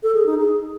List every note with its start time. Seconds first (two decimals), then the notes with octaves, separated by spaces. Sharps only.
0.03 A4
0.15 G#4
0.26 D#4
0.38 G#4